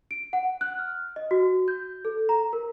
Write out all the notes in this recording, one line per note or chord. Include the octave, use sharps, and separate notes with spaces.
D7
F#5
F#6
F6
D#5
F#4
G6
A4
A#5
A#4